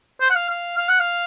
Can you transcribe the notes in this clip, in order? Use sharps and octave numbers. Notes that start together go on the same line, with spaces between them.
C5
F#5
F5
F5
F5
F#5
F5